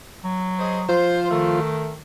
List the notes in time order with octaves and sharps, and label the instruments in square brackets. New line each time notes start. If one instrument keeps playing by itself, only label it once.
[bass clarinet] F#3
[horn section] G#4 C5 D#5
[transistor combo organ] F3 F4 [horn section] C5
[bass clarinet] D#3 [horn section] A3